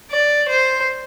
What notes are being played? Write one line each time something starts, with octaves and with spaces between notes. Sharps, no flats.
D5
C5